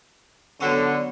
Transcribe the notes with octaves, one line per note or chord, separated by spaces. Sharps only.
D3 F#3 B3 C#4